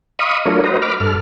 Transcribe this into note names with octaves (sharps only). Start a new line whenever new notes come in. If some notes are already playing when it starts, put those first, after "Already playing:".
D#5 F5 B5 C#6 D#6
F#3 A3 D4 F4 A#4 C#5
F#4 B4 C5 D#5 A#5
B5 D6 F6
G2 A4 F6